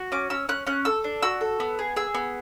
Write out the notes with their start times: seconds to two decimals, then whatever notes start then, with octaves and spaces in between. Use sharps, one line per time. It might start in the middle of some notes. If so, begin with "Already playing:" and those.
Already playing: F#4
0.12 C#4 D6
0.30 C#4 E6
0.49 C#4 F#6
0.67 C#4 F#6
0.85 A4 E6
1.04 D4
1.22 F#4 E6
1.41 A4
1.60 B3
1.79 G#4
1.96 G#4 E6
2.14 B3